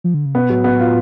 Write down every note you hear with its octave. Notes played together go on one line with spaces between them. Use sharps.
F3
D3
C#3
B2 B3
A2 F#3
B3
F4